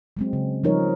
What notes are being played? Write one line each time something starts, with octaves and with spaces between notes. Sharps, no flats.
F#3 G#3 C4
C#3
F3 G3 D#4 A#4 C#5